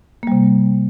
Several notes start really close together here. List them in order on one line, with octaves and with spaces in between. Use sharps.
A#3 G3 C3